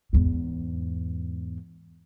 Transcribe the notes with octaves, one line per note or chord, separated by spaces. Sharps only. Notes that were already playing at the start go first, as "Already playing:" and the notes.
E2 G#2